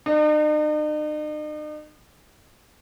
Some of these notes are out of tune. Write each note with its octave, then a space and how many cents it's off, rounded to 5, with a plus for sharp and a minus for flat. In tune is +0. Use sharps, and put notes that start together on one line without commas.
D#4 -45